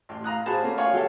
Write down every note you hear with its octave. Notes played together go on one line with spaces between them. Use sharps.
A1 C6
F5 A#5 D#6 F#6
F4 F#4 G#4 C5 A5 B5
A3 A#3 C#4
F4 C#5 F5 F#5 G#5 C#6
F#3 G4 A4 C#5 E5 F5